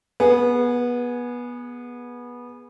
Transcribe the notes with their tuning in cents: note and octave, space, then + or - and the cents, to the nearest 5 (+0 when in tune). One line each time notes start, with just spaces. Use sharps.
B3 -20 G#4 +0